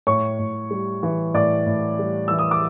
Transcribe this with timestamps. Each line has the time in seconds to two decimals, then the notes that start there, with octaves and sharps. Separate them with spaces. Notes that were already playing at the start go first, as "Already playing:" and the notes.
0.07 A2 C#5 C#6
0.39 A2
0.71 G3
1.03 E3
1.34 A2 D5 D6
1.66 A2
1.99 G3
2.28 E3 E6
2.39 D#6
2.51 D6